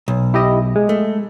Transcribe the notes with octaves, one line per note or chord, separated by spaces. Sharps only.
B1
E4 G4 D#5
G#3
A3